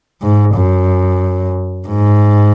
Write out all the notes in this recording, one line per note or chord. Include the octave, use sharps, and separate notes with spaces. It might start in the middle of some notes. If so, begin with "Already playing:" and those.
G#2
F#2
G#2